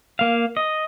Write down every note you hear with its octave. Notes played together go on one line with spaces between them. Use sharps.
A#3 F5
D#5